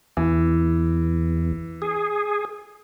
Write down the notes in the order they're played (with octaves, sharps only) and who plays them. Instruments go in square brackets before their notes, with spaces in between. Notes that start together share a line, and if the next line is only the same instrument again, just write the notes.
[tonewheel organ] E2 [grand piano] E3
[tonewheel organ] G#4